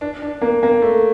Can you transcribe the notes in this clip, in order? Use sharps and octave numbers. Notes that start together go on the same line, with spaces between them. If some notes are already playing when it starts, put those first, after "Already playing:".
D4
D4
A#3
A#3
A3